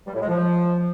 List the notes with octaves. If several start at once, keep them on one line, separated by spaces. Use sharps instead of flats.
G3
A2
G#3
F3